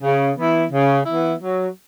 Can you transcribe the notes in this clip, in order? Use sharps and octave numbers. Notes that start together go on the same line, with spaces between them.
C#3
E3 B3 E4
C#3
E3 B3 E4
F#3